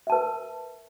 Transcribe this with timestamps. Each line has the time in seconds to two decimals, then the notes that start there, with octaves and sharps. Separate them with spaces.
0.07 E5
0.10 A5
0.12 B4
0.15 A#4